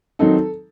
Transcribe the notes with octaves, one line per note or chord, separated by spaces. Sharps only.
D#3 F#3 C4 D#4 A4